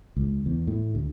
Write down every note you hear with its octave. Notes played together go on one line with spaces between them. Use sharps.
C#2
E2
A2
D2